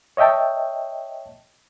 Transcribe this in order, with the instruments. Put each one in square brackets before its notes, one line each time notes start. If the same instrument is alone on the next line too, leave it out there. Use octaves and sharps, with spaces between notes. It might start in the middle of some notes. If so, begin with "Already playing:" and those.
[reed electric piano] C#5 D#5 E5 G5 A5